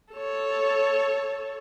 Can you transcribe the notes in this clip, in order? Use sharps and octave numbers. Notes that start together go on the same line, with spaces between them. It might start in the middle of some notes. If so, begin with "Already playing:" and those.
A4 C#5